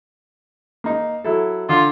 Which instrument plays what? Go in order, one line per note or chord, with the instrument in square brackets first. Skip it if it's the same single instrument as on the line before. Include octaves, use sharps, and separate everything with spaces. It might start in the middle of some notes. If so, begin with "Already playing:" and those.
[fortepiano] A#3 D#4
F#3 E4 A4
[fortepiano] D3 [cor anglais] F4